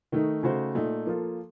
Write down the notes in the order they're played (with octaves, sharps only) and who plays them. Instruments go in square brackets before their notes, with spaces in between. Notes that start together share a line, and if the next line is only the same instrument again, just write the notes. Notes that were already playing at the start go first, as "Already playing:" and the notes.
[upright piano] D#3 A3 D#4
C#3 A3 D#4 F#4 C5
A#2 A3 D#4
F3 A#3 F4 A4